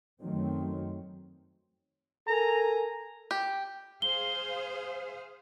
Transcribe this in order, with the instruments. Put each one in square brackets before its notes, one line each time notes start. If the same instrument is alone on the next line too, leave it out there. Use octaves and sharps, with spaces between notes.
[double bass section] F#2 D#3 F#3 A3 C4
[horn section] A4 A#4 G#5 A#5
[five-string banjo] G4
[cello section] G#4 C5 F5 [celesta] G7